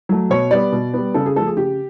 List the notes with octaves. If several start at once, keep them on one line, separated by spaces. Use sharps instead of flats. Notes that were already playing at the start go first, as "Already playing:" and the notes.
F#3 A3
B2 C#5
G3 B3 D5
B2
G3 B3
C#3 A4
G#4
F3 A3 A4
G#4
C#3 G4